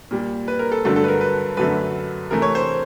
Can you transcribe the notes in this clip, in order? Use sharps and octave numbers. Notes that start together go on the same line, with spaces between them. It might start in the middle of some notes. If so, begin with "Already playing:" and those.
A#2 G3
B4
A#4
A4
G2 D3 F#3 A3 A4
A4
B4
A#4
B4
F#2 D3 F#3 A3 B4
C3 E3 A3 A#4
C#5
C5